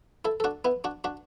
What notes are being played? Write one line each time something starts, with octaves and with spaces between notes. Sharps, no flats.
E4 A4
A4
D4 F#4
B3 E4
D4 F#4
D4 F#4